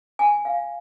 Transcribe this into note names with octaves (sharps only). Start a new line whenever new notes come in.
G#5
F5